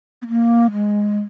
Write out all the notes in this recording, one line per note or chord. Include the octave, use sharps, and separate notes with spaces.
B3
A#3
G#3